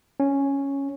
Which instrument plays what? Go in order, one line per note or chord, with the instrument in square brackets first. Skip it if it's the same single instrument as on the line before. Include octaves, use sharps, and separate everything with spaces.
[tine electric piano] C#4